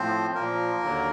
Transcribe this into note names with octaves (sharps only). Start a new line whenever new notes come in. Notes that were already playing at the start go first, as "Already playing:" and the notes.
Already playing: A2 F3 C4 C5
A#2 F3 A#3 A#4
D#2 D3 F#3